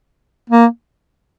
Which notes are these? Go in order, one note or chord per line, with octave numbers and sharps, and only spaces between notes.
A#3